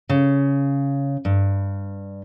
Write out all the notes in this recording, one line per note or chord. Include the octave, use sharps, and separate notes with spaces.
C#3
G2